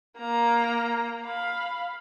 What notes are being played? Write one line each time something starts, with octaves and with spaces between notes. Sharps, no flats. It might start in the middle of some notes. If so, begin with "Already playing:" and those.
A#3 A#5
F5 B5